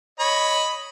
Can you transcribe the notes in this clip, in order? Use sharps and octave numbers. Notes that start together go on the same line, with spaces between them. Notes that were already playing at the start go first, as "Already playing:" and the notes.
C#5 D#5 B5